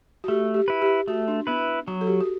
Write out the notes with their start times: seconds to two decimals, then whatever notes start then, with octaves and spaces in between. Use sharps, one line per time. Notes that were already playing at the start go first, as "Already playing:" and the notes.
0.24 F#4
0.28 A3 G4
0.54 G4
0.68 E4 B4
0.82 G4
1.08 A3 F#4
1.28 D4
1.47 B3 E4 B4
1.87 F#3 F#4
2.01 A4
2.07 G4
2.21 F#4